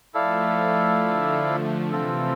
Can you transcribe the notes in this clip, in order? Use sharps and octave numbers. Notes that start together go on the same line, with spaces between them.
F3 A3 E4 A4 D5 F5
D3 F3
C3 E3 C4 F4 A4